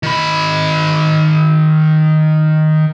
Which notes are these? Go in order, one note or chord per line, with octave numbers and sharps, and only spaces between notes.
D#3 B5